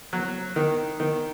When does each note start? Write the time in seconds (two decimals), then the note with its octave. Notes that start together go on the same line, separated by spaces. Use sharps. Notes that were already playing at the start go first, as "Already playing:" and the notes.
0.13 F#3
0.56 D#3
1.00 D#3